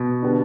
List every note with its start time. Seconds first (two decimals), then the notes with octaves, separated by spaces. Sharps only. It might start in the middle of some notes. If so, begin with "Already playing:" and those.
Already playing: B2
0.22 D3 G3 B3